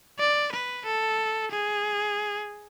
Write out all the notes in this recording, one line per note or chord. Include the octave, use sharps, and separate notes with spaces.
D5
B4
A4
G#4